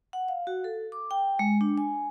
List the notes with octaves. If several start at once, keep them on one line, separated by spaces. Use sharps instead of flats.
F#5
F5
F#4
A4
D6
G5
G#3
D4
G#5